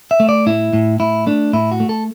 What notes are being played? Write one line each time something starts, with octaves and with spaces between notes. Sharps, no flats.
E5
A3
D5
A2 E4
A2
A2 E4
A3 D4
A2 E4
F#4
A3
A4